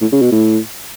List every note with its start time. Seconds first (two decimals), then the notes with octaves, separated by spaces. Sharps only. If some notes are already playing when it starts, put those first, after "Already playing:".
0.01 A2
0.12 C#3
0.22 B2
0.32 A2